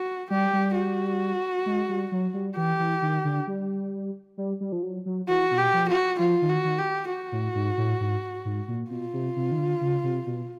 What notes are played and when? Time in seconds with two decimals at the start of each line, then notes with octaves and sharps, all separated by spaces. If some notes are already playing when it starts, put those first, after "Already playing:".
Already playing: F#4
0.30 G3 G4
0.53 G3
0.75 F#4
1.66 G#3
1.89 G3
2.12 F#3
2.34 G3
2.57 E3 G4
2.79 E3
3.02 D#3
3.24 D3
3.47 G3
4.38 G3
4.61 G3
4.72 F3
4.83 F#3
5.06 F#3
5.28 E3 F#4
5.51 B2
5.58 G4
5.73 F3
5.89 F#4
6.19 F3 F4
6.42 D#3
6.49 F#4
6.64 D#3
6.79 G4
7.10 F#4
7.32 A2
7.55 G#2
7.78 A2
8.00 G#2
8.45 G#2
8.68 A#2
8.90 B2 F4
9.13 C3
9.36 C3
9.51 D#3
9.58 D3
9.81 C#3
10.03 C3
10.26 B2